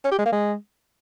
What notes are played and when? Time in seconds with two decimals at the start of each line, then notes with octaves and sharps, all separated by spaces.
0.05 C#4
0.11 G4
0.18 G#3
0.25 A#3
0.32 G#3